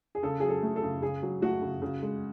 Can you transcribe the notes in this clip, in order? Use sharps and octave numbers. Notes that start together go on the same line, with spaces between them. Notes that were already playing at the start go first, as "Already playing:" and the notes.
G#4
C#3 A4
F#3 G#4
A4
A3
A4
C#3
C#3 G#4
F#3
A3 F#4
C#3
C#3
G#3